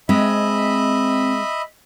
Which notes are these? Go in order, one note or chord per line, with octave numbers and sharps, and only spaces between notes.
G#3 C4 D#5 E5 B5